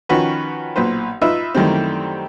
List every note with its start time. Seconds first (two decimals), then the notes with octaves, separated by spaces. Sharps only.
0.09 D#3 F3 C#4 F#4 B4 C#6
0.76 B1 A#2 B4 C5
1.22 D#4 F4 B4 E5
1.55 F#2 D#3 E3 G3 A3 C4